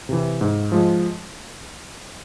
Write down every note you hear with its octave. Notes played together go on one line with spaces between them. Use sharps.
C3 E3
G#2
F3 G#3